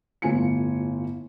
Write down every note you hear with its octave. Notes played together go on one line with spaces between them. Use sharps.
G1 A2 F4 G#5 C#7